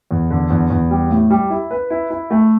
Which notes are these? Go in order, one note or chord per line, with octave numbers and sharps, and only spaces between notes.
E2
D3
E2
E2
G3
A2
G3
E4
B4
E4
E4
A3